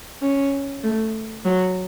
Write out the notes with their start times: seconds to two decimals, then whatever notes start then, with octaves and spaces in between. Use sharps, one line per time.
0.22 C#4
0.84 A3
1.45 F#3